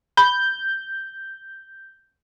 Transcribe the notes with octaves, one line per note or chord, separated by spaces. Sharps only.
B5 G6